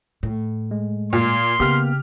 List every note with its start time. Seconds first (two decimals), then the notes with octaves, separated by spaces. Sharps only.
0.23 A2
0.71 G#3
1.13 A#2 C6
1.60 C#3 A#3 B3 G4 F6